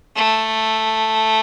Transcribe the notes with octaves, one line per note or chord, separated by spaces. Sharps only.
A3